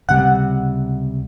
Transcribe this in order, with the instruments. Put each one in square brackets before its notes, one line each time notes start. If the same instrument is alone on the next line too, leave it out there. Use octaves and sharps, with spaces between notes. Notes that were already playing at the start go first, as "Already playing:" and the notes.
[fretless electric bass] C#2 C3 G3 [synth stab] F#5